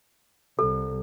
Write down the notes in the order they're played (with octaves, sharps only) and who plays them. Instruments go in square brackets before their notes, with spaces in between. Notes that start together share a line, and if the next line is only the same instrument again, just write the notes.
[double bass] C2 [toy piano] A4